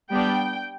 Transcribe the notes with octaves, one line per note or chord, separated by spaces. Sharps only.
G3 B3 D4 G5